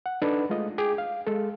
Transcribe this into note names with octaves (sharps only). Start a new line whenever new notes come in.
F#5
D4 D#4 A4 B4 B5
G#3 A3 F4 D#5
G#4 G5 D6
F5
G#3 A4